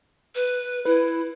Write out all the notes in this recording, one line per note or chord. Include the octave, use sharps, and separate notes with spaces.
B4
E4 B4